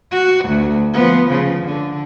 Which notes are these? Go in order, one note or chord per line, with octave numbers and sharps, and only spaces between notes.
F#4
D2
F3 B3
C#3 F3
D3